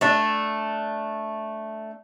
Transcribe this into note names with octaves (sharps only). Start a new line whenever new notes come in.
A3 D4 E5